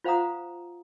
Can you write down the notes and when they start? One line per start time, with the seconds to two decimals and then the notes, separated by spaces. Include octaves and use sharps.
0.04 F4 C5 F5 F#5 A#5 D#6